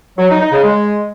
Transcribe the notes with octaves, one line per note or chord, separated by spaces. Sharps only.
F#3
D#4
D#4
C#3
G#3